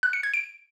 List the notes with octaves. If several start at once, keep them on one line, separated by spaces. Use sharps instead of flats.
F#6
C#7
G#6
D7